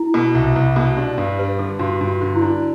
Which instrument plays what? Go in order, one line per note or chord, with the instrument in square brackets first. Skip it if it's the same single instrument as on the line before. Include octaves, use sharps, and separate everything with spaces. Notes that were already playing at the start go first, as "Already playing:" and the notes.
Already playing: [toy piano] E4
[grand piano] B2
C2
C2
B2
[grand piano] D4 [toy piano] G4
[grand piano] G2 [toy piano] A4
[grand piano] G3 [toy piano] B4
[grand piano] D3 [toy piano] A4
[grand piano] G2 [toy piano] F#4
[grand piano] G2
[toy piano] F#4
[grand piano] D3
[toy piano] E4
[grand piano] D4